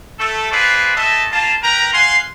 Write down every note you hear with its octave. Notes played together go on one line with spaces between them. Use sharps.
A3 A4
F4 G#4 B4 C5 D5
A3 D#5 E5 A5
A#3 F4 A5
A#4 B4 G5 A#5
F5 F#5 G#5 C6